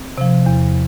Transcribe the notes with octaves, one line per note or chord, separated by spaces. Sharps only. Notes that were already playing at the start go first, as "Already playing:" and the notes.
Already playing: C4
C3 F3
E2